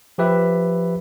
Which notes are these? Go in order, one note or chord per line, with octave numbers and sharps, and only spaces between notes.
F3 G4 B4 E5